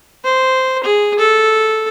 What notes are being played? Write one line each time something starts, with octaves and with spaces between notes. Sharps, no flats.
C5
G#4
A4